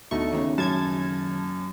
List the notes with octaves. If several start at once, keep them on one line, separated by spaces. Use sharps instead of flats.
D2 B2 A3 D#4 C#6
D#2 A2 C#3
F#2 A5 G#6